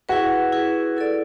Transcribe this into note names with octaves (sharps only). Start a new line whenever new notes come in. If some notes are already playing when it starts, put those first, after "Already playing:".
E4 F#4 G#4 B4
E4 G#4 B4
E4 A4 D5